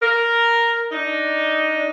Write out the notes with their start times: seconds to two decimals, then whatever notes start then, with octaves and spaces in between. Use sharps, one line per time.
0.02 A#4
0.92 D4 D#4